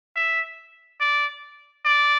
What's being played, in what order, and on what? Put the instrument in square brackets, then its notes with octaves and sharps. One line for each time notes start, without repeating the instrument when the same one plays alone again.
[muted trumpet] E5
D5
D5